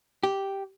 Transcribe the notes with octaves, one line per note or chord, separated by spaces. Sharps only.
G4